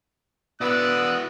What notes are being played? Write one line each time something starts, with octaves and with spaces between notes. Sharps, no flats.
B3 E4 F#4 D5 D#6 E6 F#6